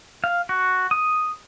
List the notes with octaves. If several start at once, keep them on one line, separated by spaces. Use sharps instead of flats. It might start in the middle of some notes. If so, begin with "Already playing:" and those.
F5
F#4
D#6